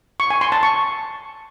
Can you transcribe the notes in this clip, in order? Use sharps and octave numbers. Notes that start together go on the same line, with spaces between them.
C#6
G#5
C6
A5
C#6